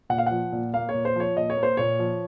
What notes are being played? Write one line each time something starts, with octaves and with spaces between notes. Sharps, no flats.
A#2 F#5
F5
F3 F#5
A#2
A#3 F5
C#5
A#2
C5
F3 C#5
A#2 D#5
C#5
A#3
C5
A#2 C#5
F3